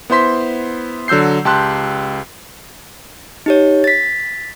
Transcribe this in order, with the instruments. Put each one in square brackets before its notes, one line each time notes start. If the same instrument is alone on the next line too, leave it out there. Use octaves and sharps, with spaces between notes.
[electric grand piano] B3 E4 C5 C6 B6
D3 F#3 E6 G6 C7
C#2 G4 A5 C6 F#6
[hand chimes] D#4 G4 C#5
A6 B6